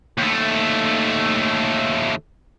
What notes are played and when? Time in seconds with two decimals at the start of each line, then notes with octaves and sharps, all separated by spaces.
0.18 D#2 A3